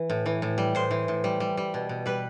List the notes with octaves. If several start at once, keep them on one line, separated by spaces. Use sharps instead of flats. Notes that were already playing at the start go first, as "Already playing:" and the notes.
Already playing: E3
A2
E3
A2
G3
A2 C5
E3
A2
G3
G3
G3
B2
B2
G3 B4